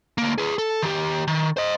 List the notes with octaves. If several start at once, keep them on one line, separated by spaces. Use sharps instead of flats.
D2 A#3
G#4 B4
A4
D#3 G4
D#3
C5 D#5